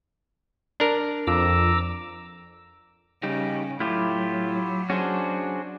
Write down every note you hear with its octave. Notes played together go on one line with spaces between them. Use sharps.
D4 A#4
F2 A#5 D6 E6
C#3 G3 D#4 G4
A2 F#3 E4 F4 G4
C#4 D4 F#4 G#4 C5